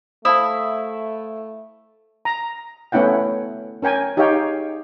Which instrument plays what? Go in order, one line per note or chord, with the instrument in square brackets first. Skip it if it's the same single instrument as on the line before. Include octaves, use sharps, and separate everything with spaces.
[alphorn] A3 [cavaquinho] E4 E5 D#6 [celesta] C5 F5 A5
[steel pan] A#5
A3 B3 C#4 E4 F#5 G5
C#4 A#4 G5 G#5
D#4 G4 G#4 C#5 F5 G5